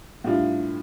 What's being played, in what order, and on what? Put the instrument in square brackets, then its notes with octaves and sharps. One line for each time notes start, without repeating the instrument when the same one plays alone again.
[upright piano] A2 G3 D4 F4